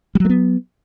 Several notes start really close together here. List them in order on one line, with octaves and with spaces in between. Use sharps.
G3 F#3 A3 B3